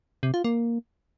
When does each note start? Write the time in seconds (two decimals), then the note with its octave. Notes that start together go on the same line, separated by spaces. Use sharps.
0.23 C3
0.34 F4
0.44 A#3